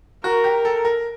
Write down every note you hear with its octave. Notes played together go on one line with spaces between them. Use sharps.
F#4 A#4
G4
A4
A#4